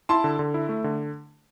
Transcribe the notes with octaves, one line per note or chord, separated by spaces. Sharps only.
E4 A5 C6
D3
D3
E4
A3
D3